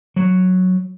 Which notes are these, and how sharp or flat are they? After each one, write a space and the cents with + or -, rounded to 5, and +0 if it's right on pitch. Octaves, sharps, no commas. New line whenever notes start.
F#3 -5